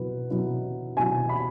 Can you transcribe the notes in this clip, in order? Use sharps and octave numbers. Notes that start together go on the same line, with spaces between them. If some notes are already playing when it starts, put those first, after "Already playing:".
Already playing: B2 F#3 E4 B4
B2 F#3 E4
B2 F#3 E4 G#5
B5